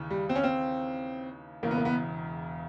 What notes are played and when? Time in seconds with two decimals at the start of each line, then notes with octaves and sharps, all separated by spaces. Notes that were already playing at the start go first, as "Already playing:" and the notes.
Already playing: D#2 C#3 E3
0.10 G3
0.29 C4
0.35 C#4
0.44 C4
1.63 E1 E2 C#3 A#3
1.71 B3
1.78 A#3
1.85 B3